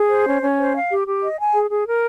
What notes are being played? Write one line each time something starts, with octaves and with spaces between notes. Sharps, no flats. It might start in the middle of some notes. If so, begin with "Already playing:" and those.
Already playing: G#4
C5
C#4
C#4
C5
F5
G4
G4
D#5
G#5
G#4
G#4
A#4